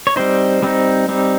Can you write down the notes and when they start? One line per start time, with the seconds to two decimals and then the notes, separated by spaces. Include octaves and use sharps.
0.07 C#5
0.16 G3 C4 D#4 C5
0.62 G3 C4 D#4
1.09 G3 C4 D#4